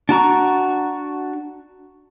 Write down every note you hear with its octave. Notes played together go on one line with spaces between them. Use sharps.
D4 F#4 A#5 C#6